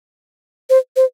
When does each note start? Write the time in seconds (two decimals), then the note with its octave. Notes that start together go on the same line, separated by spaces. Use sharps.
0.70 C5
0.96 C5